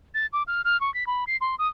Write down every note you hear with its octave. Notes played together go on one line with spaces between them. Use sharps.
A6
D6
F6
F6
C#6
B6
B5
C7
C6
D#6